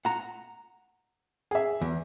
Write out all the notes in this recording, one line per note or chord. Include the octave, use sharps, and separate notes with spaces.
F#5 A#5
G#4 E5
E2